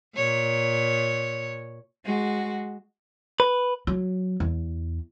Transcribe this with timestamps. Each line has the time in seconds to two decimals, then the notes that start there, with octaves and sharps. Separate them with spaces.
0.16 A#2 C#5
2.06 G#3 F#4
3.40 B4
3.87 F#3
4.40 E2